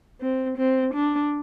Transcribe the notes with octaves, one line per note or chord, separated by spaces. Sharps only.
C4
C4
D4